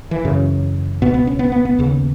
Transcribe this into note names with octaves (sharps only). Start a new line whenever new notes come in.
E3
F#2 C#3
C#2 B2 B3
B3
C#4
B3
B3
B3
D#2 C#3